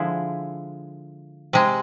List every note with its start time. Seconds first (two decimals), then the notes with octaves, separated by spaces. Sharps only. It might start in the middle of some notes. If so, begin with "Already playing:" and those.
Already playing: D3 F3 G#3 E4 G#4
1.53 C3 G#3